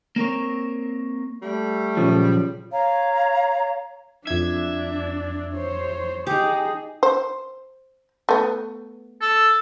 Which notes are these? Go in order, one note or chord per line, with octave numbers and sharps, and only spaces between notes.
A#3 C4 A#4 C#5
G3 A3
A#2 C#3 F3 F#3
C#5 F5 A#5
F2 D4 E5 G#6
C5 C#5
D#4 G4 G#4
C5
A3 B3
A4